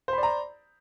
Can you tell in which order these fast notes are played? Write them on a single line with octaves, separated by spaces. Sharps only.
C5 B5 D5 A#5